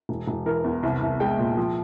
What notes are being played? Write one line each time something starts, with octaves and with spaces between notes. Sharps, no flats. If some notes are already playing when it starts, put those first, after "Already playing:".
E1
E1
E3 A#4
E2
C2
C2
G#3 G5
A#2
F3